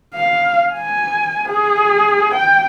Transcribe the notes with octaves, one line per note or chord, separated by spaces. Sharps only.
F5
G#5
G#4
G5